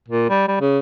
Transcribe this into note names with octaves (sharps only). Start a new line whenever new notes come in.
A#2
G3
G3
C#3